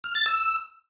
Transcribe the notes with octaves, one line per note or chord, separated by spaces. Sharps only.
F6
A6
E6